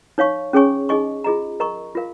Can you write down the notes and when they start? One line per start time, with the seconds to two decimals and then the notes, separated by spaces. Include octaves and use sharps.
0.18 D#4 C#5 F5 C#6
0.53 C#4 G#4 C#5 G#5 C#6
0.89 D#4 G#4 D#5 G#5 C#6
1.24 F4 G#4 D#5 A#5
1.60 A#4 D#5 A#5 C#6
1.95 F4 A#4 F5